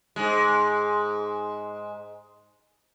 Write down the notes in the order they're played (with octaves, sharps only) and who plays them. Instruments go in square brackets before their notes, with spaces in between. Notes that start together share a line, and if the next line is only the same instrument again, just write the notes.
[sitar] G#2 G#3